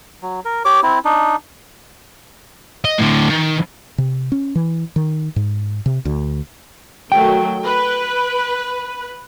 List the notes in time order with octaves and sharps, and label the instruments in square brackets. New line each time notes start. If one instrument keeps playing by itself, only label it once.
[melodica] F#3
A#4
G4 C#5 D6
C4 E4
D4 D#4
[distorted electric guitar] D#5
A2 D3
D#3
[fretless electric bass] C3
C#4
E3
D#3
G#2
C3
D2
[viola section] D#3 F#3 A3 [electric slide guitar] G5
[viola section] B4